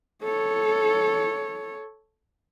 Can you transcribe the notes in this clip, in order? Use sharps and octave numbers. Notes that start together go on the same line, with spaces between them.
A4 C#5